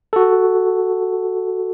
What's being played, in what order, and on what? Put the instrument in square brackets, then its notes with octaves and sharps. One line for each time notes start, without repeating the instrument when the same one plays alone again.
[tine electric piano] F#4 A4